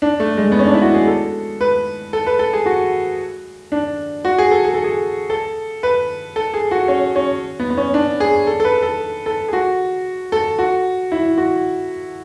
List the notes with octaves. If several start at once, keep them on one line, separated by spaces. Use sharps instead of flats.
D4
A3
G#3
B3
C#4
D4
E4
F#4
G#4
A4
B4
A4
B4
A4
G#4
F#4
D4
F#4
G#4
A4
G#4
A4
G#4
A4
B4
A4
G#4
F#4
C#4
C#4
B3
B3
C#4
D4
G#4
A4
A4
B4
A4
A4
G#4
F#4
A4
F#4
E4
F#4